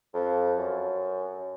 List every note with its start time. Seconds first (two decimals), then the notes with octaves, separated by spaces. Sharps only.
0.14 F2
0.58 F#2